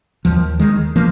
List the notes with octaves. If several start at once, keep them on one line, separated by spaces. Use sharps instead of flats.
D#2 F3
D#3 G#3
F3 A#3